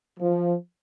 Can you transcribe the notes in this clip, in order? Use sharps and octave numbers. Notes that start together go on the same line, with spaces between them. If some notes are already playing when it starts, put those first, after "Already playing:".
F3